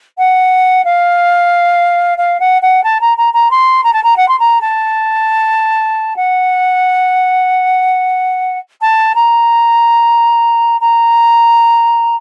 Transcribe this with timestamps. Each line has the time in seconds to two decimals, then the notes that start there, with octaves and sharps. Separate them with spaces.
0.18 F#5
0.84 F5
2.18 F5
2.40 F#5
2.62 F#5
2.83 A5
3.00 A#5
3.17 A#5
3.33 A#5
3.50 C6
3.83 A#5
3.93 A5
4.03 A#5
4.16 F#5
4.28 C6
4.39 A#5
4.61 A5
6.16 F#5
8.81 A5
9.15 A#5
10.80 A#5